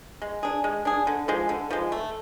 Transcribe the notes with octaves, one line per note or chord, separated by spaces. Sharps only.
G#3
D4 G#4
G#3
D4 G#4
D3
F3 G#3
D3
F3 G#3
A3